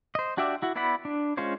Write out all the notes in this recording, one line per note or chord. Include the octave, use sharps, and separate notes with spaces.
C5 D#5
D4 F#4 G4 D5 E5
E4 F#4
B3 E4 D5 F#5 B5
D4
G#3 C#4 F4 C5 C#5